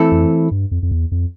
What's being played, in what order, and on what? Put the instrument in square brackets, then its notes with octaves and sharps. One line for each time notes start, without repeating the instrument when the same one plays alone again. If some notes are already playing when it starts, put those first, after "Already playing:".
Already playing: [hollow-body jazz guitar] E3 A3 C4 E4 A4
[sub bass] F2
G2
F2
F2
E2
F2